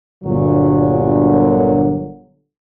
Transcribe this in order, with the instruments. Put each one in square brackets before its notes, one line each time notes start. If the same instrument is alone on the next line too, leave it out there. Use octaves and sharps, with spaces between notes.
[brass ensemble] G1 A#2 D3 F#3